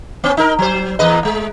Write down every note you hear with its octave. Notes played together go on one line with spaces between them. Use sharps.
B3 C#4
D#4 A#4
F#3 C5
E2 B4 D#5
G#3